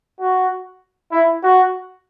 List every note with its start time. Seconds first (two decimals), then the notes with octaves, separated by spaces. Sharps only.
0.20 F#4
1.12 E4
1.43 F#4